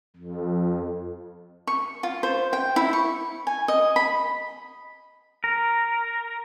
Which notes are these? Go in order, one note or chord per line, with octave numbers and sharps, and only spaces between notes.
F2
C#6
F4
C5
G5
E4
C#6
G#5
D#5
B5
A#4